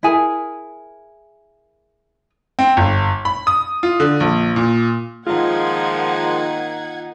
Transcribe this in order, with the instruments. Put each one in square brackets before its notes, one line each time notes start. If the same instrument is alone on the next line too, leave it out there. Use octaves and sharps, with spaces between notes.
[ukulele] E4 G#4 A#4
[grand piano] C4
G1
B5
D#6
F4
D3
A#1
A#2
[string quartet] D#3 A#3 D#4 [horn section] F3 G#3 [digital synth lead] F4 [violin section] F#5 G#6